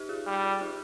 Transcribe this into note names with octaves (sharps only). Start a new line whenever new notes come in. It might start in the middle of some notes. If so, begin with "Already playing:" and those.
Already playing: D#4 G4
F4 G#4
G3
F4 G#4
D#4 G4